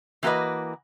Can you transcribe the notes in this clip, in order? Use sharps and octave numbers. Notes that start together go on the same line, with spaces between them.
E3 A#3 F#4 A4 B4 D#5